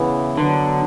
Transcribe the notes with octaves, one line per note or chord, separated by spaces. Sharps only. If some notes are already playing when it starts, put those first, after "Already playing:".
Already playing: C#3 E3 B3 E4
D3 F#3 B3 D4